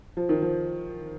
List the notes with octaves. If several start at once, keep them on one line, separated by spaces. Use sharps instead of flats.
F3
D#3
F3